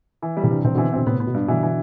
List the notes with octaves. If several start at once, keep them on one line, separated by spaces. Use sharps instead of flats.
E3
G3
C3 E3
G2
C3 E3 C4
B2 D3 E3
B2 D3 C4
A2 C3 B3
A2 B3
B2
G2
B2 D3 E3
E3